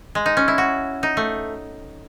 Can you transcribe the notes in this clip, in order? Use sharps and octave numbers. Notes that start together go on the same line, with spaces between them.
G#3
D#4
C#4
E4
F#4
D#4
A3